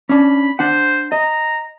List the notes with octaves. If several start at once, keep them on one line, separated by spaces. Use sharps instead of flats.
C#4 D4 B5
D4 C5 F#5
D#5 A#5